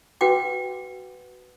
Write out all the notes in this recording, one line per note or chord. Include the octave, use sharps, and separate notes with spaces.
F#4 B4 F#5 G5 D6